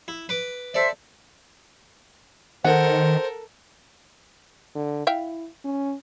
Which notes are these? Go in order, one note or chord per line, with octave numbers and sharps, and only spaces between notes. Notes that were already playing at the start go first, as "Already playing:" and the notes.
E4
B4 D6
A4 C5 D5 E5
D#3 A4 A#4 C5 F#5
D3
E4 E5 F5 G5
C#4